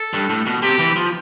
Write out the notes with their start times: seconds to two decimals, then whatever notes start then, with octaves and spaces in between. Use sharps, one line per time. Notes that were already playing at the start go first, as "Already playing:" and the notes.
Already playing: A4
0.13 G2
0.30 A2
0.46 B2
0.63 C3 G4
0.79 E3
0.96 F3